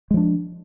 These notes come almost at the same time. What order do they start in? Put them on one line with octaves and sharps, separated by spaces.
G#3 F3 D4